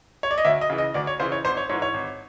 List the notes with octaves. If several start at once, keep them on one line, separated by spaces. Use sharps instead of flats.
C#5
D5
D#5
D2 E5
D#5
C#3 E3
D#5
D2 D5
C#5
C#3 E3 C5
C#5
G#1 C5
C#5
G#2 E3 C#5
C#5
G#1